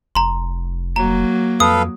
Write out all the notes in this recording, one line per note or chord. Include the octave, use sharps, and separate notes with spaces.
F1 A#5 C6
F#3 A#3 A#5
F2 A4 B4 F5 D#6